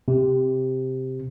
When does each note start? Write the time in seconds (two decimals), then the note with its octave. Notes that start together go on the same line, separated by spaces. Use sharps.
0.08 C3